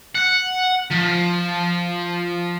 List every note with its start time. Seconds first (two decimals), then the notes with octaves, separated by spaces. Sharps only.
0.15 F#5
0.91 F3